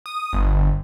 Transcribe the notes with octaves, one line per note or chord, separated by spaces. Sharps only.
D#6
G1